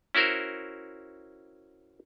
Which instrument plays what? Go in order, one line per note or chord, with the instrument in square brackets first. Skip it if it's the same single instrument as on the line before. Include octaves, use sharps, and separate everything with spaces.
[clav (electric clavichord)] C#4 E4 F#4 A#4 C5